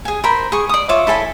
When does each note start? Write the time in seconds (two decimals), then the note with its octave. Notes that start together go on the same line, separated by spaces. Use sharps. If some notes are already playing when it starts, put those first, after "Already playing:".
0.05 G#4 G#5
0.24 A#4 C5 B5
0.52 G#4 C#6
0.69 D5 D#6
0.89 F4 C#5 E5 D6
1.07 E4 A4 G#5 B5